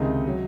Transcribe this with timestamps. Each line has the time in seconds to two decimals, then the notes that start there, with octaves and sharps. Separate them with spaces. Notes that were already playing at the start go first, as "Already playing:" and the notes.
Already playing: C#2 C3 D#3 G#3 D#5
0.27 F#3